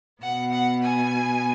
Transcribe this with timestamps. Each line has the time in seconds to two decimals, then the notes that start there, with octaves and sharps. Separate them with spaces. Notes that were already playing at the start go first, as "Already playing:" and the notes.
0.22 B2 B3 F#5
0.52 F#5
0.82 G#5